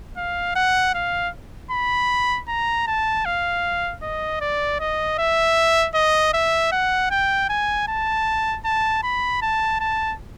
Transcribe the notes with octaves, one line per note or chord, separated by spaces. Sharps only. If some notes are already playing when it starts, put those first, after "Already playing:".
F5
F#5
F5
B5
A#5
A5
F5
D#5
D5
D#5
E5
D#5
E5
F#5
G5
G#5
A5
A5
B5
A5
A5